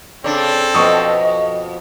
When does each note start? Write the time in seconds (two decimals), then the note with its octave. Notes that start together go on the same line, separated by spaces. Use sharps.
0.24 C#3 C4 D4 A4
0.75 F2 B2 D#5 C#6 D#6